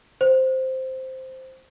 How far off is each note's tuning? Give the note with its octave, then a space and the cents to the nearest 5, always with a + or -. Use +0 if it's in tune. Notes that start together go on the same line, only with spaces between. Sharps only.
C5 +0